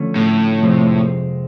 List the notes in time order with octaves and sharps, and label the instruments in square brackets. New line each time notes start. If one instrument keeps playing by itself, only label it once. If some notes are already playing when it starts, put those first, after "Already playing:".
Already playing: [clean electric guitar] D3 F3 A3 C#4
[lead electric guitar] A2
[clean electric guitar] F2 C3 F3 G#3 C4